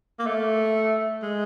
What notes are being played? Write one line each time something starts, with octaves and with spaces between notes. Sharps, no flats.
A#3
A3
G#3